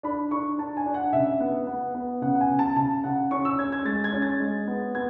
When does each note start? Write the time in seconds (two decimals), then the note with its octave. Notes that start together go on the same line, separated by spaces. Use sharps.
0.03 D4 B5
0.31 D4 C#6
0.58 D4 A5
0.77 G#5
0.86 D4
0.94 F#5
1.13 C#3 E5
1.40 B3 F#5
1.67 B3
1.95 B3
2.22 C#3 F#5
2.35 F#5
2.41 G#5
2.50 C#3
2.59 A5
2.76 C#3 A5
3.04 C#3 F#5
3.31 C#4 C#6
3.45 E6
3.59 C#4 G#6
3.72 G#6
3.85 G#3 A6
4.04 G#6
4.12 C#4
4.22 A6
4.40 G#3
4.67 B3
4.95 B3 G#6